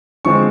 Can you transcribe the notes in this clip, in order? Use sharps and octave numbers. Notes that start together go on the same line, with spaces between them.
D3 F3 G#3 C4 C#6